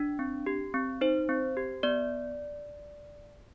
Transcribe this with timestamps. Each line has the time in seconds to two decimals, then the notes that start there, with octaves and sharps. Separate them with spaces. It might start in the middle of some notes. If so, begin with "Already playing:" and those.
Already playing: D4
0.19 C4
0.46 G4
0.74 C4
1.01 D#4 C5
1.29 C4
1.57 G4
1.83 B3 D5